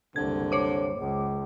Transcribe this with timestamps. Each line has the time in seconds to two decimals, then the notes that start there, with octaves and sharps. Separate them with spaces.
0.16 F#1 C2 D3 G#6
0.52 C5 C#5 D6
0.98 C#2